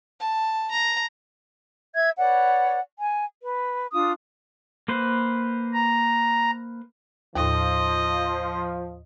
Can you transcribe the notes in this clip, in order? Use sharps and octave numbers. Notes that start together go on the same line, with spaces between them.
A5
A#5
E5 G#6
B4 C#5 D5 F#5
G#5
B4
D4 F4 D#6
A#3 B4 C5
A#5
D#2 A2 F3 D#5